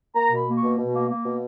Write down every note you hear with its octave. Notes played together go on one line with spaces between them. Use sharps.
A#3 A#5
B2 B5
A#3
C#6
B2
B2
A#3
A#3
B2